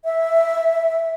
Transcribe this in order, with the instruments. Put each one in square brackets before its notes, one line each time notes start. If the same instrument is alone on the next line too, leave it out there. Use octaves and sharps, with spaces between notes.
[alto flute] E5